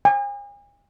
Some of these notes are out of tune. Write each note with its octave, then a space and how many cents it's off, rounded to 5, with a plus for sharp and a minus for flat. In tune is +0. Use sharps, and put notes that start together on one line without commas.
G#5 -40